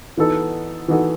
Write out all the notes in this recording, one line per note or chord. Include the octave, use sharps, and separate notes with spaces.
E3 B3 D#4 F#4 A4
E3 B3 D#4 F#4 A4